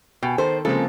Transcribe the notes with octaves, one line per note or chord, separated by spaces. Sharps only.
B2 G5 G#5
D#3 A4 C5
C#3 F3 G#3 A#3 C4 A4